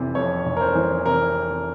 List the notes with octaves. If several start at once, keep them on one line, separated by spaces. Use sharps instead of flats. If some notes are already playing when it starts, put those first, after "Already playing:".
Already playing: F1 C3 E3
F2 C#5
F1
A#4
C5
E3
C3 A#4